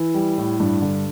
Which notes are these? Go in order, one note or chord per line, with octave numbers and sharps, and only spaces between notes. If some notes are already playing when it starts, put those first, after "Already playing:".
Already playing: E3
G3
A2
G2
D3